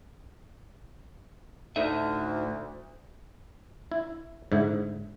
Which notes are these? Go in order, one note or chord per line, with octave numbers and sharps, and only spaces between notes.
D2 A2 D#4 E5
E4
G#2 D3 E4